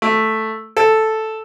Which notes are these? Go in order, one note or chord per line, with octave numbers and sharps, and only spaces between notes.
A3
A4